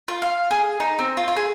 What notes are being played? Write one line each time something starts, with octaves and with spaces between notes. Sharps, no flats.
F4
F5
G#4
D#4
C4
F4
F4
G#4